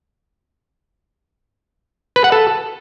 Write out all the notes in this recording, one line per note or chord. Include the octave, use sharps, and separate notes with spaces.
B4
F#5
A4